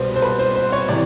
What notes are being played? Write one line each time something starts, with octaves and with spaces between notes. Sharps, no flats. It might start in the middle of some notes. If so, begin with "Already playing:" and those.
Already playing: C2 B2 G3 B4 C5
C5
B4
C5
C5
C#5
C3 E3 D5